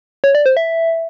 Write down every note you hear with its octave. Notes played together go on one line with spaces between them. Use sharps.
C#5
D5
C5
E5